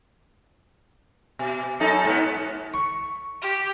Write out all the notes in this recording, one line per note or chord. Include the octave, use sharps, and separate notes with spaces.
B2
F#2 D#4 A4
G#2 B3
C#6
G4